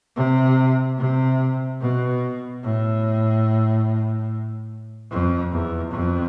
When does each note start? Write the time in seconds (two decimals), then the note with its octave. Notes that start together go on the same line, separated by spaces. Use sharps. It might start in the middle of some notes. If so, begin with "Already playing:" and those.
0.16 C3
0.98 C3
1.81 B2
2.63 A2
5.11 F2
5.52 E2
5.92 F2